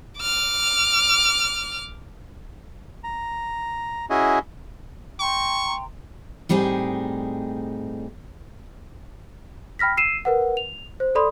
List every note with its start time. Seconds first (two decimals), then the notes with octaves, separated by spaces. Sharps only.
0.21 D6 F6
3.04 A#5
4.10 C#4 E4 F#4 G#4 D#5
5.20 G5 A#5 C6 C#6
6.49 A2 G3 C4 D#4 G#4
9.79 G5 B5 F6 A#6 B6
9.97 E6 C7 D#7 E7
10.25 A#4 B4 F#5
10.57 F7
11.00 C5
11.15 A4 D5 B5 C6 D#6